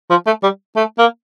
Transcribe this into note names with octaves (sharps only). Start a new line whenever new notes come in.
F3
A3
G3
A3
A#3